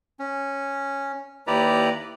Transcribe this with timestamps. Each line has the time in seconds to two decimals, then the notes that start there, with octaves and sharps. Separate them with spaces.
0.19 C#4
1.47 D#2 E4 G4 B4 D5 A#5